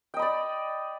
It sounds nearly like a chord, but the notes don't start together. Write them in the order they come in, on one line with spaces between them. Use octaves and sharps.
G5 D#5 B5 D5